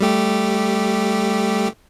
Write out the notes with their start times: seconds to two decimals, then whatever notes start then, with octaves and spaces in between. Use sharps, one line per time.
0.01 G3 A3 G4